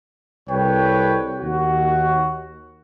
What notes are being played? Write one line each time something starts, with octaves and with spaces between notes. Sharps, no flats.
C2 A4 B4 C#5 G5
D#2 F#4